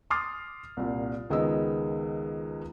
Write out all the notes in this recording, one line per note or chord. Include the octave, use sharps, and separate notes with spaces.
C6 D6 D#6 F6 A6 C7
C2 A#2
C#2 D#3 G#3 B3 D#5 E6